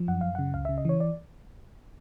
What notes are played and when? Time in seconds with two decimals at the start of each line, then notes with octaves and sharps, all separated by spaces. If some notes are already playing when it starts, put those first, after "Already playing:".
Already playing: F3
0.08 F#2 F#5
0.21 F#2 F5
0.35 C#3 F#5
0.54 C#2 F5
0.65 C#3 E5
0.78 D#5
0.85 E3 C#5
1.00 D5